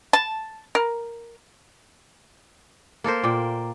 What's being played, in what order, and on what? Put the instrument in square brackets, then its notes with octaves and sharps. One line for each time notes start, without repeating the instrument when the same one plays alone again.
[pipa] A5
A#4
[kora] A#3 A4 A#4 C5
A#2 D5 G5